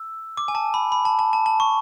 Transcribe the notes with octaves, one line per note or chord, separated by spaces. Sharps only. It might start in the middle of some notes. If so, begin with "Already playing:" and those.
Already playing: E6
D6
G#5
A5
B5
B5
A5
A5
A5
A5
C#6